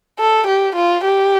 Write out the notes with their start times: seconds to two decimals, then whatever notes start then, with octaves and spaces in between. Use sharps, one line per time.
0.19 A4
0.47 G4
0.76 F4
1.04 G4